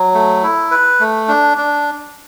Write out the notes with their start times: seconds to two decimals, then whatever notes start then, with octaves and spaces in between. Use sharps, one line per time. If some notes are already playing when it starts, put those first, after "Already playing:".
Already playing: F#3
0.14 A3
0.43 E4
0.71 B4
1.00 A3
1.28 D4
1.58 D4